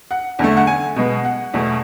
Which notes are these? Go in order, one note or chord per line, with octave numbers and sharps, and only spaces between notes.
F#5
E2 D3 A3
F#5
G#5
B2 G#3 B3
F#5
E2 B2 A3